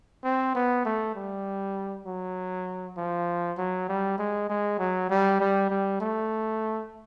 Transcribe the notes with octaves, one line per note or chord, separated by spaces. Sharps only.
C4
B3
A3
G3
F#3
F3
F#3
G3
G#3
G#3
F#3
G3
G3
G3
A3